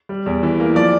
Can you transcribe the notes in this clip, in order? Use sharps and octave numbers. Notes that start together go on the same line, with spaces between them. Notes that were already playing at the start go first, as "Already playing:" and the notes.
G3
E2
E3
A#3
F3 D5